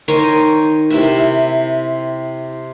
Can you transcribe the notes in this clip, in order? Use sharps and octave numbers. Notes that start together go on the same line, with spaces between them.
D#3 D#4 C5 C#5
C3 E4 E5